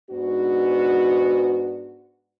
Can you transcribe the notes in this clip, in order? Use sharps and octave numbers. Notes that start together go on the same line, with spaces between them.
G#2 B3 D4 F#4